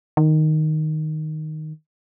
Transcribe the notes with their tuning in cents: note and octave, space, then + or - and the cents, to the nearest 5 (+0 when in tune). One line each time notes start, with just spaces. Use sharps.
D#3 -5